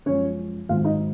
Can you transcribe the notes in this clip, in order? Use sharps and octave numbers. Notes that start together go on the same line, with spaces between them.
F#2 F3 G#3 C#4 C#5
G#1 G#2 F#3 C4 F4 F5
D#4 D#5